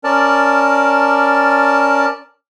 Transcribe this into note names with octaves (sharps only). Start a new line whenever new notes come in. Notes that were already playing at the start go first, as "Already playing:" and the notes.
C#4 A#4 D5 A5